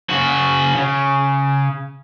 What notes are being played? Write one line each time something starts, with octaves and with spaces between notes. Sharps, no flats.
C#3 F#4
C#3